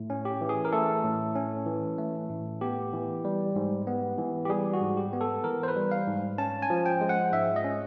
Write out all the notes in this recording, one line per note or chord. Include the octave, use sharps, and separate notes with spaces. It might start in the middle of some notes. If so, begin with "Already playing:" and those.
Already playing: A2 A3
C#4
G4
E3
G#4
A#4
A3 A4
A2
C#4
E3
A3
A2
B3 G4
E3
G3
G#2
B3
E3
G4
G3 G#4
F#4
G#2
G4
B3
A4
E3 A#4
C5
B4
G3
F5
G#2
C#4 A5
G#5
F3
G5
G#3
F#5
G#2 E5
D#5
C#4